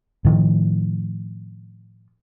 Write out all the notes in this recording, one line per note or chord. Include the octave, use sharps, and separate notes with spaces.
A2 D#3 F3